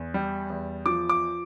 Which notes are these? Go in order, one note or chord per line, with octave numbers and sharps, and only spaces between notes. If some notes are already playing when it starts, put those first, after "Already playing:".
Already playing: E2
G3
E2
F3 D6
D6